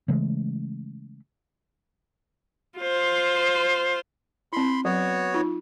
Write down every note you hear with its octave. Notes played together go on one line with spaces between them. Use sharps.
C#3 E3 G#3 A3
F4 C5
C4 E4 B5 C6
F#3 B3 F#4 C#5
D#4 F4